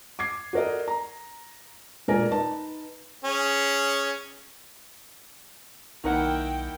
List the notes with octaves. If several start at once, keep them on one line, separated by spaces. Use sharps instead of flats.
D6 G#6 C7
F#4 A4 A#4 D5 D#5
A#5
E1 A#2 A3 A#4 D5 G#5
D#4 B4 A5
C#4 G#4
B1 D#3 A#3 D#4 E4 A#4 F#5 G5